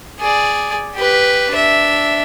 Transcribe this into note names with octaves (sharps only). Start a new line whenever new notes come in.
G#4 D5
G4 B4
D4 E5